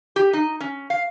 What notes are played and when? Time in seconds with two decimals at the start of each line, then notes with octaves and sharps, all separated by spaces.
0.16 G4
0.33 D#4
0.60 C#4
0.90 F5